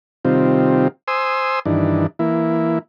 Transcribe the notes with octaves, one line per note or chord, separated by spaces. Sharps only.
C3 D#3 G3 C4 F4
C5 G#5 C6 D#6 E6
G2 D#3 E3 D4
E3 A#3 E4